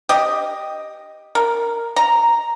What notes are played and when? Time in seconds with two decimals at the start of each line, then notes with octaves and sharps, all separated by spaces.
0.09 G4 D#5
1.35 A#4
1.96 A#5